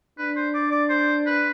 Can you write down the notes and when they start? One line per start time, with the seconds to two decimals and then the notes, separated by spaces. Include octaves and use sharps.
0.18 D4 B4
0.36 C5
0.54 D5
0.71 D5
0.90 C5
1.26 B4